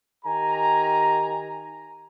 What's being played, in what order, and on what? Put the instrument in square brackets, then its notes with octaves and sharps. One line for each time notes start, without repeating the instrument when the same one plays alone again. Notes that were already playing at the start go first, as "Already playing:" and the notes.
[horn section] D#3 G4 G#5 A#5